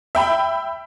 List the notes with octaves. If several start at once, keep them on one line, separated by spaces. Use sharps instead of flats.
E5 G5 B5